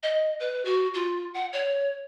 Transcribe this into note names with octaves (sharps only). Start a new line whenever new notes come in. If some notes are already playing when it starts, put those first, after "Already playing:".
D#5
B4
F#4
F4
F#5
C#5